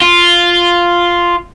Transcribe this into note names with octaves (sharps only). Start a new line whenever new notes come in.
F4